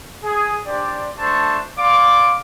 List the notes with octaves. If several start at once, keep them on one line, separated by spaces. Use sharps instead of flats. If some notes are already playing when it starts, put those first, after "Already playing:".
G#4
D4 G4 C5 D5
A3 D4 C5 A5 C#6
D5 F5 C6 D6